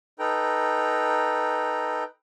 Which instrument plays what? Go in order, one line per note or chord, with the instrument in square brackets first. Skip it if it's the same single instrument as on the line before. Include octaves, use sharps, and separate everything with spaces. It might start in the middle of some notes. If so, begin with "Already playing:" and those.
[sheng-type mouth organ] D#4 A4 B4 G5 A#5